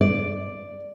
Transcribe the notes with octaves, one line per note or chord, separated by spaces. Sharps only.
D5